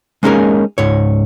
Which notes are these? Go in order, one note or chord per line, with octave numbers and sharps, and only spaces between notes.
G#3 A#3 C#4 D#4 G#4 A#4
C#2 G#2 C#5